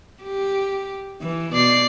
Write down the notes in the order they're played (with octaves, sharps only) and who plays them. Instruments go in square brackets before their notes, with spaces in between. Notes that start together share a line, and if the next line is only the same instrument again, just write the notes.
[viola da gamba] G4
E3
[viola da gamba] B2 [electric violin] D5 C7